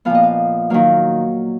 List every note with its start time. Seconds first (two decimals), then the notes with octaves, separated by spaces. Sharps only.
0.05 A#2 F3 B3 F5
0.15 D#5
0.23 F5
0.70 D#3 F#3 A#3 F5